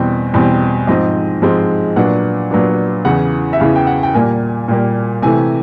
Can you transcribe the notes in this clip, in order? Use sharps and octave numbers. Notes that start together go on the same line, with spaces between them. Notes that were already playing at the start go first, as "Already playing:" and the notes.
Already playing: E2 B2 G3 C4
E2 B2 G3 C4
G#2 F3 G#3 C4 D#5
G#2 F3 G#3 C4
A#2 F#3 B3 D4 F#5
A#2 F#3 B3 D4
E2 C#3 E3 F#5
E5
E2 C#3 E3 F5
G5
F#5
G5
A#2 G3 A#3 G#5
A#2 G3 A#3
C3 E3 A3 G#5